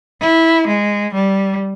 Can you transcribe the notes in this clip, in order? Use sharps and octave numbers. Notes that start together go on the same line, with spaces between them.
E4
G#3
G3